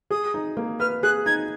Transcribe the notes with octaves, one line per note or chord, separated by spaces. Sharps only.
G#4 D#6
D#4
A#3
B4 F6
G#4 F#6
D#4 G#6